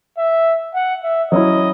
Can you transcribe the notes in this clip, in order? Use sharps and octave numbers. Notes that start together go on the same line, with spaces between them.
E5
F#5
E5
F#3 C#4 E4 D#5